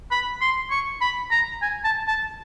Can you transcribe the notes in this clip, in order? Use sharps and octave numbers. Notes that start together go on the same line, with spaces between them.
B5
C6
C#6
B5
A#5
G#5
A5
A5